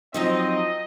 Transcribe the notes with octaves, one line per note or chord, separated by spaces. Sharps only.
F3 F#3 C4 D#4 D#5